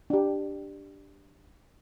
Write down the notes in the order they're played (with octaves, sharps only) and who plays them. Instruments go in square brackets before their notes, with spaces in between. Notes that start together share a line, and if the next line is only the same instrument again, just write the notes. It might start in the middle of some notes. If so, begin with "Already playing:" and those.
[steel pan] D4 G4